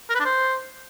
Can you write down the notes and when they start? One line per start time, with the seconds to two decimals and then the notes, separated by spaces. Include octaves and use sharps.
0.10 A#4
0.15 B4
0.20 D4
0.25 C5